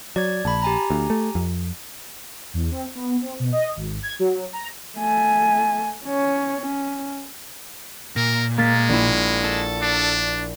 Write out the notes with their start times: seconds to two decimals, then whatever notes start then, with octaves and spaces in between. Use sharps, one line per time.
0.16 F#3 D5 G#6
0.45 A#1 A5 B5
0.62 G4 G#5 A#5
0.90 D2
1.10 A3
1.35 F2
2.54 E2
2.71 C4
2.95 B3
3.22 C4
3.40 B2
3.52 D#5
3.76 G#1
4.03 G#6
4.19 F#3
4.53 A#5
4.98 A3 G#5
6.04 C#4 C#5
6.60 C#4
8.16 A#2 A#4
8.57 G#3 A#3 A6 B6
8.89 A#1 E4
9.44 A4
9.82 D4